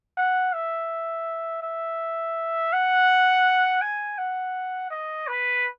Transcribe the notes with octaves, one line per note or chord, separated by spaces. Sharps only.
F#5
E5
E5
F#5
G#5
F#5
D#5
B4